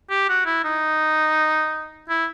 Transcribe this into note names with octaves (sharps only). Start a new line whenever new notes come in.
G4
F#4
E4
D#4
E4